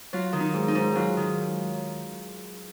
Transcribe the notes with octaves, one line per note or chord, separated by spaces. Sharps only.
F#3 F4
D#3
D#4
G#2
D#4
G#2
F#3 F4
D#3